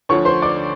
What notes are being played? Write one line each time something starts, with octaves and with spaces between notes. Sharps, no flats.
D2 D3 F3 C#5 C#6
C5 C6
D5 D6